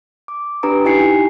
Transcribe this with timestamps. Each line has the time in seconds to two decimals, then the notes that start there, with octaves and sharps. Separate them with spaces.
0.28 D6
0.63 D4 G4 B4 A#5 D#6 D7
0.84 D#4 E4 G4 G#5 C7 C#7